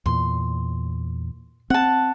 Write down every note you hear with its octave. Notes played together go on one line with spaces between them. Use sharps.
E2 A#2 C6
C4 F#5 A5